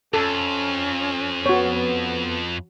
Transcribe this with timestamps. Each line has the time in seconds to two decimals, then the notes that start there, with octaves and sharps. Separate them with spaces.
0.14 F2 C#4 A4
1.46 B3 F#4 C#5